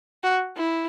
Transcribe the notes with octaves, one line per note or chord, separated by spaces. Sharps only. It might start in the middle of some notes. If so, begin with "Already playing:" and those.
F#4
E4